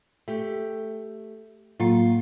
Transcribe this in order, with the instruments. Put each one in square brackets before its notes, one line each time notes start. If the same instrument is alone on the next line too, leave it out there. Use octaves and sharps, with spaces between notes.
[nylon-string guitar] A3 G4
[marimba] A2 F#3 A#3 [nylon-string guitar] F4